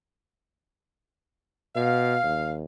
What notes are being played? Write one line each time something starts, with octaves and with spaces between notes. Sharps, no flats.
B2 F5
D#2